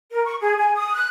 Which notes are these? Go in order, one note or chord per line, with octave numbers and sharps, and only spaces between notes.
A#4
C#6
G#4
G#5
D#6
F#6